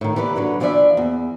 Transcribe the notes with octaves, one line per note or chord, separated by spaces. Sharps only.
A2 D#3
E3 G4 B4 C#5 D5
D3 F#3 B4
E3 F3 D4 A4 D5 E5
E2